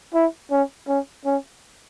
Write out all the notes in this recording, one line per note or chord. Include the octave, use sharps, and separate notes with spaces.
E4
C#4
C#4
C#4